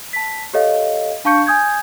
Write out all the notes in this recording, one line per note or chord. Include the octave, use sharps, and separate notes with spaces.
A5 B6
G4 A4 C#5 D#5 F5
D4 F5 A5 C#6 G6 C#7
G#5 D#6 G6 G#6